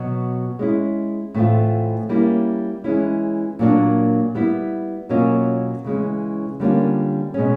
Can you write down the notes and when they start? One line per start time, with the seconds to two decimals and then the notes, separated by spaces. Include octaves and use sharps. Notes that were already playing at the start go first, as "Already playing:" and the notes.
Already playing: B2 F#3 B3
0.59 G#3 C#4 E4
1.34 A2 E3 A3 C4 F4
2.09 G3 A#3 C#4 E4
2.84 E3 G#3 C#4 E4
3.59 A#2 F#3 A#3 D4
4.35 G3 B3 E4
5.09 B2 F#3 A#3 C#4 F4
5.84 C#3 E3 G#3 C#4
6.60 D3 G3 A#3 C#4 F4
7.34 B2 G#3 C#4